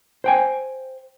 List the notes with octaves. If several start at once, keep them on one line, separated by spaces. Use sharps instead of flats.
C5 G5 G#5